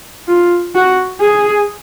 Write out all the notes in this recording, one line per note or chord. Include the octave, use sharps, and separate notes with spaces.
F4
F#4
G#4